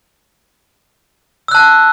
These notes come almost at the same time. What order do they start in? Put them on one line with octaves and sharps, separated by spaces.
E6 F#6 A5